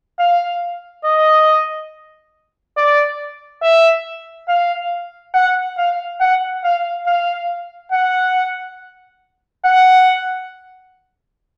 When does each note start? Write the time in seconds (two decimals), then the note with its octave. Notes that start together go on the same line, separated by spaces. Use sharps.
0.19 F5
1.05 D#5
2.77 D5
3.63 E5
4.48 F5
5.34 F#5
5.78 F5
6.21 F#5
6.64 F5
7.06 F5
7.92 F#5
9.65 F#5